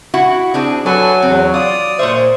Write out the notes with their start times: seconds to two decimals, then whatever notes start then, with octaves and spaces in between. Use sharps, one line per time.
0.14 E4 F#4
0.54 C4 D4 G#4
0.86 F#3 A4 B4 G#5
1.22 E2 C4
1.54 F4 D5 D#6
1.99 A#2 C5 C#5 E5